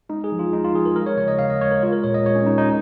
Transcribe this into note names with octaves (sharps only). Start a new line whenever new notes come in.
G#3 D#4
G#4
F3
F4
G#3 D#4
F4
F3 G#4
A#4
G#3 A#4
C#5
C#3 C#5
D#5
C#3 F5
D#5
G#3 C#5
A#4
G#3 F4
A#4
A#2 C#5
D#5
G#3 C#5
C#4
G#3 D#4
D#4